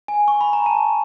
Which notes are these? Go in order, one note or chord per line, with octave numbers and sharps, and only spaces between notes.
G#5
C#6
B5
A#5
A5